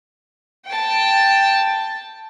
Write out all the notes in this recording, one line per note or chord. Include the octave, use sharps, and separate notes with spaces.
G5 A5